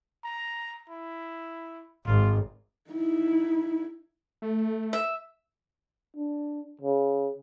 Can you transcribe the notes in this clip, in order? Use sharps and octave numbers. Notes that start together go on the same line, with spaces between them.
A#5
E4
G#1 F4
D#4 E4
A3
E5
D4
C#3